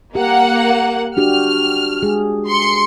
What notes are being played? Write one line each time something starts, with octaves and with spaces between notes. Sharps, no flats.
A#3 G4 F#5
D4 F#4 G4 F6
G#3 G#4
C6 C#7